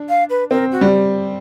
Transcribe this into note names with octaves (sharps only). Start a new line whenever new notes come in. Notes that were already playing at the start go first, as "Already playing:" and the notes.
Already playing: D4
F5
B4
C4 A#4
F#4
G3